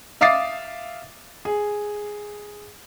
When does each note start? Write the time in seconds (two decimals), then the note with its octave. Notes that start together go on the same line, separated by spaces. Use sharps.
0.21 E5 F5 D6 D#6 A6 C7
1.45 G#4